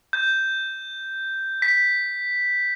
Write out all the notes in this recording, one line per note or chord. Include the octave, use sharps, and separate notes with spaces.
G6
B6